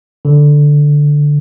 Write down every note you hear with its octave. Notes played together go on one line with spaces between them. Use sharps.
D3